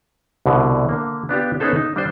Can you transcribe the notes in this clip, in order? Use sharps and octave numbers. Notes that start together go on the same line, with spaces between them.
C2 B2 D3
D3 A#3
B3 D4 F4 G4
B3 C#4 D#4 G#4 A4 C5
D#4
G3 D4 C5